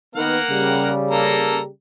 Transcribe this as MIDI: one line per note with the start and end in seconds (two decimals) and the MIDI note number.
0.15 0.38 51
0.15 0.91 58
0.15 0.38 59
0.15 0.91 70
0.15 0.91 78
0.50 1.69 49
0.50 1.69 55
1.11 1.59 58
1.11 1.59 69
1.11 1.59 82